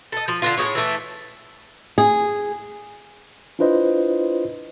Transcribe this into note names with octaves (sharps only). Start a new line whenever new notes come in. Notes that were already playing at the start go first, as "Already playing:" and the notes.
A4 D#5
F3
D3 B3 F4
A2 G3 G#4 C#5
E3 A3
G#4
D4 E4 F4 B4 C5 D#5